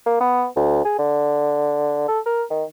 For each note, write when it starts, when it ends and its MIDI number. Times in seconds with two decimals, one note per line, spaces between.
0.06 0.18 58
0.21 0.46 59
0.56 0.84 38
0.85 0.95 68
0.99 2.08 50
2.09 2.20 69
2.26 2.44 70
2.51 2.64 51